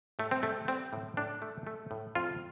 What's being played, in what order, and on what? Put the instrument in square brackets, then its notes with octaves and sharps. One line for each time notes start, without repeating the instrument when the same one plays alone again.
[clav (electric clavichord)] A2 A3
C4
G3 A3
G3 C4
A2
A2 D4
A3
A3
A2
F2 F4